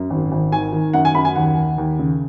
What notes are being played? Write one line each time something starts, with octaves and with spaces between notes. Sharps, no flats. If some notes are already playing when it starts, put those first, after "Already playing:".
Already playing: F#2
G#1
G#1
D#3 G#5
D#3
F#2 F#5
G#5
F#2 B5
G#5
D#2 F#5
D#2
D#2
C#3